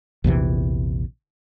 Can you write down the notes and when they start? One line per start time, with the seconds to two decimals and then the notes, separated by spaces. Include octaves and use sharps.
0.24 A#1 E2 C3 E3